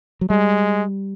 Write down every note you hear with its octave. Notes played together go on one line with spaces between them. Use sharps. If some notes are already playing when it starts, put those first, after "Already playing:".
F#3
G3 G#3